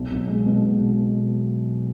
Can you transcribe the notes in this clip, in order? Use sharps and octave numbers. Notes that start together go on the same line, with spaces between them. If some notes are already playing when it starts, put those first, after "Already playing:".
Already playing: B1
B1
G#3
B2
B2
B2